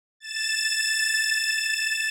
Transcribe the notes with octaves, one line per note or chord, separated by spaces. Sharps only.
A6 E7